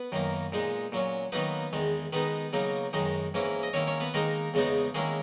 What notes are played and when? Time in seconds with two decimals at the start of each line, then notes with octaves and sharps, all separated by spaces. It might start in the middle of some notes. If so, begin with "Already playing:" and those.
Already playing: B3 B4
0.12 F#2 D#3 A#3
0.52 A#2 G#3 D#4
0.92 A#2 F#3 C#4
1.32 D#3 F#3 A#3 B3 D#4 B4
1.73 E2 D#3 G#3
2.13 D#3 G#3 B3 D#4 B4
2.53 C#3 F#3 A#3 D#4
2.93 F#2 D#3 G#3 D#4
3.34 G#2 E3 A#3 C#4 E4
3.63 D#5
3.73 D#3 A#3 C#4 E4 C#5
3.87 C#4 C#5
4.00 B3 B4
4.14 D#3 G#3 A#3 D#4 A#4
4.54 E2 C#3 G#3 B3 D#4
4.95 D#3 G#3 A#3 C#4 E4 G#4